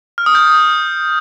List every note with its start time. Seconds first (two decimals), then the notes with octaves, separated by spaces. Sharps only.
0.18 F6
0.26 D#6
0.35 G6